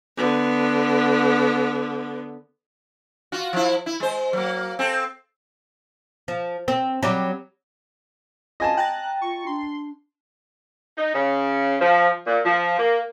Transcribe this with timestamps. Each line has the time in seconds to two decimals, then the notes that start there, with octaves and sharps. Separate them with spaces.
0.17 D3 B3
3.32 F4 F#4
3.53 F3 E4
3.86 E4
4.00 G#3 C5
4.33 F#3 A#3
4.79 C4 A4
6.28 F3
6.68 C4
7.03 F#3 G3 G4
8.60 F4 D#5 G#5 A5
8.77 G5 A#5 F#6 A6
9.21 F4 C#6
9.47 D4 C6
10.98 D#4
11.15 C#3
11.81 F3
12.27 A#2
12.46 F3
12.79 A#3